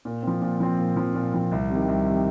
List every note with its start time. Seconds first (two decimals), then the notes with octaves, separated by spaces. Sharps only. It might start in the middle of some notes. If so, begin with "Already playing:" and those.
0.05 A#2
0.22 F3 C4
0.42 A#2
0.60 F3 C4
0.79 A#2
0.97 F3 C4
1.15 A#2
1.34 F3 C4
1.51 C2
1.70 C3 D#3
1.88 C2
2.06 C3 D#3